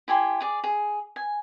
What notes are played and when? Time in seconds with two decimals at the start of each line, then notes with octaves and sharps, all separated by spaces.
0.08 E4 G4 G#5 C6
0.40 G#4 D5
0.64 G#4
1.16 G#5